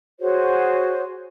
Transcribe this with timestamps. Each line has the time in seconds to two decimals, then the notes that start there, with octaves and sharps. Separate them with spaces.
0.20 F#4 G#4 C5 C#5